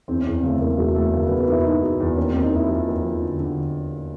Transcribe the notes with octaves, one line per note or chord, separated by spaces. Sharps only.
E2 C4
C#4
E2
C4
C#3 A3
E2 A#3
E1 A3
E2 A3
C#3 A#3
B3
E1
B3
E1 E4
E1 D#4
E1
E2
D#2 C#4
C4
D#2
D#4
D#2 E4
F3
D#2
F3
D3
D3